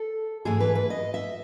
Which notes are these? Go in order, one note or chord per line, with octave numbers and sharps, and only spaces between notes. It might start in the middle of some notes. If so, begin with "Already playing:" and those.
Already playing: A4
G#2 E3 A3 G#4
B4
B4
D#5
E5